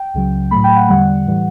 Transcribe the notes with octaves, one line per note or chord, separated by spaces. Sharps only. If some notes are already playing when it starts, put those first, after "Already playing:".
Already playing: G5
C#2 C#3 F#3
A2 F#3 A3 B5
G5
F#5
G5
E2 D3 G3 F#5
A2 E3 G3